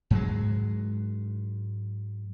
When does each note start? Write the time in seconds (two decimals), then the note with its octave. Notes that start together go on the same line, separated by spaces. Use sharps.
0.11 G#2 F#3 G#3